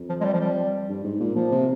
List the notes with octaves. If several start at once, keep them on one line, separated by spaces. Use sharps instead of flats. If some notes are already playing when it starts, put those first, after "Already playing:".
Already playing: F2
F3
G#3
G3
F3
G3
G2
G#2
A#2
A#2 F3
C3